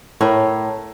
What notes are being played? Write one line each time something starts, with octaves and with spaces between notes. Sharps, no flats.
A2 A#4 C#5